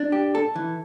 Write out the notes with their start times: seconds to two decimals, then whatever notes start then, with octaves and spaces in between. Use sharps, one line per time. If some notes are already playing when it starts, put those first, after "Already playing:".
Already playing: D4
0.12 G4
0.35 A4
0.56 E3